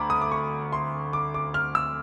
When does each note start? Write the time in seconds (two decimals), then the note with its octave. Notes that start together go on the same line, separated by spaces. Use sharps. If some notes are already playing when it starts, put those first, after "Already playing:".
Already playing: D2 A#5 B5 D6
0.10 D#6
0.22 D6
0.32 C#6
0.72 C6
1.13 D6
1.34 D6
1.54 F6
1.75 E6